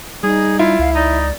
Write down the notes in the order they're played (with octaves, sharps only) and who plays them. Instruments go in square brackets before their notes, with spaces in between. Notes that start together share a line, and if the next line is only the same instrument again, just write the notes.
[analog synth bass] G3 [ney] D#4 [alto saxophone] G#4
[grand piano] E4 [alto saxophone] F4
[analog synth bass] C#2 [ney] F5
[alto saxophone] D#4 [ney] D5